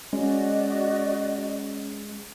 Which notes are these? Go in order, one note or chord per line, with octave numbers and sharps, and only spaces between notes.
G#3 C#4 F#4 D5 D#5